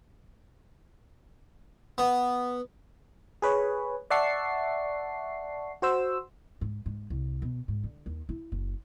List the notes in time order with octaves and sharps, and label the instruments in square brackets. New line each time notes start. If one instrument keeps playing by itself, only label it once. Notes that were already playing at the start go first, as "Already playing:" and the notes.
[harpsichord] B3
[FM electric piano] G#4 B4 C#5
D5 E5 F#5 A5 C#6 C7
F#4 C5 E6
[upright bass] G#2
G#2
C2
B2
G#2
D3
D#2
E4
F#1